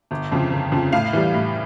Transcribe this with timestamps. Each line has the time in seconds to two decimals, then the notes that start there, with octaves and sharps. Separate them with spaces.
0.11 G1
0.32 F2 C#3 F3
0.51 G1
0.72 F2 C#3 F3
0.93 A2 F5
1.13 E3 G3
1.34 A2